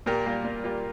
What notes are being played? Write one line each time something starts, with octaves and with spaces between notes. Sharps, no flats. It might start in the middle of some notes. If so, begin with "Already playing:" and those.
A#2 G4 A#4
G3 A#3 F4
A#2
G3 A#3 F4